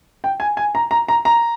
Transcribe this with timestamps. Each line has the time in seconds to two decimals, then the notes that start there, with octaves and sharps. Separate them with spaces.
0.24 G5
0.40 G#5
0.57 G#5
0.75 A#5
0.91 A#5
1.08 A#5
1.25 A#5